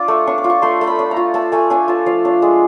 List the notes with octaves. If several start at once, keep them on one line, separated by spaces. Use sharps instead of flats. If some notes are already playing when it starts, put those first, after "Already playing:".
Already playing: D4 F4 D6
A3
D4 C#6
D6
F4
C#6
A3 C6
A3
B5
D4
A#5
F4
A3 A5
A3 G#5
D4 G#5
F4 A5
F3 F5
D4
G#3